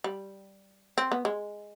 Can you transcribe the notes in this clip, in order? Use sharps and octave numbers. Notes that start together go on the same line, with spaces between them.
G3
C4
B3
G#3